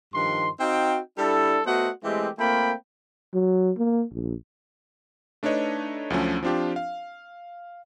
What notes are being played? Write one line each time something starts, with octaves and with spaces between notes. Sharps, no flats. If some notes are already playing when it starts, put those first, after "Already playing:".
G2 D#3 F3 C6
C4 D#4 F#4 F5 G5
G3 D4 E4 A4
A3 B3 F#4 C5 D#5 F#5
E3 G#3 A3 C4 G4
A3 A#3 C4 F4 G5 B5
F#3
A#3
A#1
A3 D4 D#4 B4 C#5 D#5
D2 D3 F3 F#3 A3 C#4
F3 C4 D4 F4 G4
F5